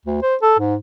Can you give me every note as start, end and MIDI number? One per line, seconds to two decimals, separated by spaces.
0.06 0.18 38
0.22 0.35 72
0.42 0.54 69
0.59 0.75 44